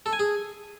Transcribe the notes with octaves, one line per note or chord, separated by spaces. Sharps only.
A4
G#5
G#4